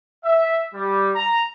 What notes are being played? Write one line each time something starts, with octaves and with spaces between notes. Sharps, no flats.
E5
G3
A#5